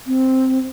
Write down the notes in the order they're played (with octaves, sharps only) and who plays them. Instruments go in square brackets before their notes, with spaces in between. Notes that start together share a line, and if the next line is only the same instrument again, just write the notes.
[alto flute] C4